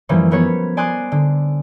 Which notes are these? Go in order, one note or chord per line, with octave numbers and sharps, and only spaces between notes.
F#2 E3 F3 G3 A#3 C#4
F3 G3 B3 A#4 B4 C#5
D5 G#5 C6 D#6 F#6
D3